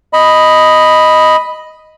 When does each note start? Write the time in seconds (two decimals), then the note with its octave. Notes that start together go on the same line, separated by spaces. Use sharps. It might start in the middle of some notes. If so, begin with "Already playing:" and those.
0.13 D#5 B5